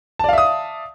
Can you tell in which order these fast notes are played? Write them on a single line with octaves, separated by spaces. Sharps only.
A5 D5 F5 E5 D#6